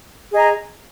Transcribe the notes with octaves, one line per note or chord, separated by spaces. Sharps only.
G#4 D#5 A#5